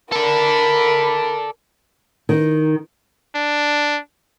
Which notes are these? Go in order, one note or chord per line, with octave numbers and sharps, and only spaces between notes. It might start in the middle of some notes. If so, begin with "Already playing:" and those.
A4 A#4 D5 E5 B5
D#3
D4